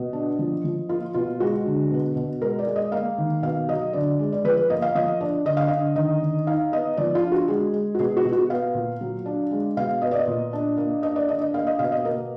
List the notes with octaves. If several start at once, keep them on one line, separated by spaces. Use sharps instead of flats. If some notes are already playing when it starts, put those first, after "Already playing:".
Already playing: B2 D#5
D4
F3
F3
A#3 F4
B2 F4
G#3 F#4
D3
B2
B2
G#3 A#4
D5
G#3
D#5
A#3 F5
D#3
B2 F5
F#3 D#5
D3 D5
G#3
D5
F3 B4
B4
A#3 D#5
F5
F3 D#5
D4 D5
D3 D#5
F5
D3 D#5
D#3 D#5
D#3
D#4 F5
B3 D#5
F3 D5
F4
D4
F#4
G#3 G#4
G#3
F#4
B2 G#4
F#4
B2
F#4
B3 F5
A#2
F#3
D4
G#3
B2 F5
B3 D#5
D5
D#5
A#2
D4
A#3
D4 D#5
D5
D4 D#5
D#5
A#3 F5
D#5
B2 F5
D#5
A#3 A#4